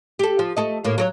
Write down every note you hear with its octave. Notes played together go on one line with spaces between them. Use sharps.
G4 A4
F3
A3 A4 D#5
A2 A#3
F#3 A#4 C#5